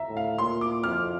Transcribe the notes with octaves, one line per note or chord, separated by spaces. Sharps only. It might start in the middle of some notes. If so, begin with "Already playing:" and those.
Already playing: E5 A#5
A2
F5
A#2 C6
D6
F2 F6